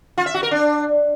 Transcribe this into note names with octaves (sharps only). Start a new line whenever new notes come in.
F4
E5
F#4
A#4
D4